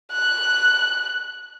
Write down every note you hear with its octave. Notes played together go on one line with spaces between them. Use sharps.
F#6